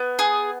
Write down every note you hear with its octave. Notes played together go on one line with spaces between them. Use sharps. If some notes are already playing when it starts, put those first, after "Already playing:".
Already playing: B3
G#4